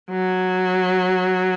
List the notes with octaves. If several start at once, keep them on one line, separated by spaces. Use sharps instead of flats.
F#3